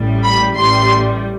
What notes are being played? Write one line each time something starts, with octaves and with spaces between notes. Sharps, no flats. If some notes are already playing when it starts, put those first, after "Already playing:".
Already playing: A1 A2 G3
B5
A1 A2 G3 C6